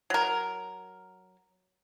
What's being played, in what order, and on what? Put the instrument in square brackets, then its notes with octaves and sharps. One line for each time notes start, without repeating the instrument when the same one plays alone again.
[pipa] F#3 A#4